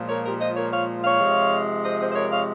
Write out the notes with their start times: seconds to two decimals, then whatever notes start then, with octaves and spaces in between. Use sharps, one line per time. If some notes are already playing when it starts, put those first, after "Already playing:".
Already playing: A#2 F3 G#3
0.09 A#4 C#5
0.24 G4 A#4
0.40 C5 D#5
0.56 A#4 C#5
0.72 C#5 F5
1.04 C#5 F5
1.20 C3 F3 G#3
1.83 C5 D#5
2.00 C5 D#5
2.11 C5
2.15 A#4 C#5
2.32 C#5 F5